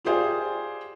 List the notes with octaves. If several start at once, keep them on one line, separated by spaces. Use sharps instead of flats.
F4 G4 G#4 C5 D5 F5